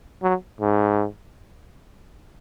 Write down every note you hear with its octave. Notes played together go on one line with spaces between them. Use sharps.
F#3
G#2